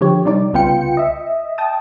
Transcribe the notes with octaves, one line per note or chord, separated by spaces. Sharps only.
D3 F3 G4 C#5
C3 G3 D#4 D5
C2 C#3 B3 F4 G5 C#7
D#5 E5
G5 A5 D#6